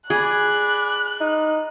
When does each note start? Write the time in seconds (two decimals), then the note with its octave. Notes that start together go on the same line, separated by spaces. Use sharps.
0.10 G#4 D5 G#5 B5 F#6
1.21 D#4